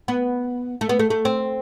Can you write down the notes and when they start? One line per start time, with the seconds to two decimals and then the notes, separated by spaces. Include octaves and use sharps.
0.08 B3
0.81 A3
0.89 B3
0.99 A3
1.10 A3
1.25 C4